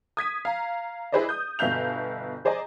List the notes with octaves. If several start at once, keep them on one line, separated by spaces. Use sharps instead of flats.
D#6 G#6 B6 D#7
F5 A#5
E4 G#4 B4 C5 D5 D#5
D#6 G6
G1 B2 E5 F5 G6 F7
G#4 C5 D5 D#5 G#5 A#5